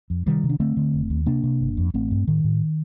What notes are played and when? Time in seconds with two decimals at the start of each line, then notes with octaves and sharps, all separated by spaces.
0.10 F2
0.26 C3 D#3 G3
0.43 C3
0.50 D4
0.60 D3 A3 C4
0.77 D3
0.94 F1
1.10 D#2
1.26 C3 A#3 D4
1.43 C3
1.61 G1
1.77 F2
1.94 A1 A3 C4
2.11 G2
2.28 A2 D#3
2.44 A2